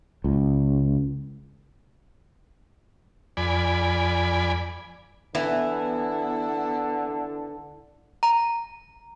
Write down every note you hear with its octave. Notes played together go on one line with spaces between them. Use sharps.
C#2
F2 D5 G#5 B5
D3 E3 B3 E4
A#5